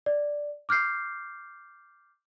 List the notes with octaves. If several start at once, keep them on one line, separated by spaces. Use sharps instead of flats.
D5
D6 F6 G6 C7